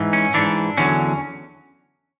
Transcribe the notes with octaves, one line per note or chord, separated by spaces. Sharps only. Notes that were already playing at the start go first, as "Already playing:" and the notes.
Already playing: G#2 E3
C#4
G#2 E3 D4
E2 D3 F#3 C#4